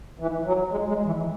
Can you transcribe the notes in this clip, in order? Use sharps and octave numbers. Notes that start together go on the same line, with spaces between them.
E3
F#3
G#3
G#3
E3